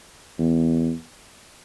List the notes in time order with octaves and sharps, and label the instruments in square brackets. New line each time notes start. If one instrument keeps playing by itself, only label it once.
[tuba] E2